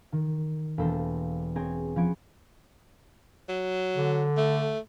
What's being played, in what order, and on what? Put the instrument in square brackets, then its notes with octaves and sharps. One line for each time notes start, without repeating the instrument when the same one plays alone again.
[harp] D#3
E1 A#3 A4 C5
C4 G#4 C#5 G#5 A#5
F3 B3 C#4 C#6 G#6 D7
[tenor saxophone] F#3
[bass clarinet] D3
[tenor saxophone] A3